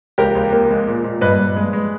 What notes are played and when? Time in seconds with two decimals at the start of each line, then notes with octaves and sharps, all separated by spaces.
0.18 C#2 G4 A#4
0.35 C#2
0.52 A#3
0.70 G#3
0.87 A#2
1.04 A#2
1.21 G2 B4 D#5
1.39 G2
1.56 G#3
1.73 G#3